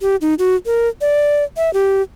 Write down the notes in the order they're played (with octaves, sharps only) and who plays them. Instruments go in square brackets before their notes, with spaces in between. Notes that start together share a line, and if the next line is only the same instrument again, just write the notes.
[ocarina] G4
D#4
F#4
A#4
D5
E5
G4